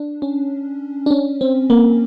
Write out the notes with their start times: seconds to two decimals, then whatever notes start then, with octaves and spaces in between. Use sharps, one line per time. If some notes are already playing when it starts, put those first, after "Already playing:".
Already playing: D4
0.22 C#4
1.06 D4
1.11 C#4
1.41 C4
1.70 A#3